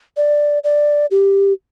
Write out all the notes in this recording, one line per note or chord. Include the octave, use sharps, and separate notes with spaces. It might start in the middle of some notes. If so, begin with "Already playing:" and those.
D5
D5
G4